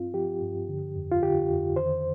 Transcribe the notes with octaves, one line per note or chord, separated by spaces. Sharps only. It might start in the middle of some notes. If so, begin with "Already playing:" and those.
Already playing: G2 C4 F4
F3 G4
G2
D3
F2
F4
D3 G4
F2
D#3 C5